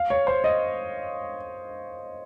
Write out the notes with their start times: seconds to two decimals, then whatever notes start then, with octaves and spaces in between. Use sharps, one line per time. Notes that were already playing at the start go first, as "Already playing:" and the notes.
Already playing: F5
0.10 C#5
0.27 C5
0.44 D#5